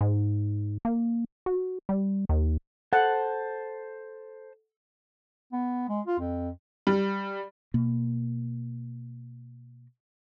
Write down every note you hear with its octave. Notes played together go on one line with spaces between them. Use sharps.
G#2
A#3
F#4
G3
D#2
A4 C5 F#5 A5
B3
G#3
F4
F2
G3
B2 A#3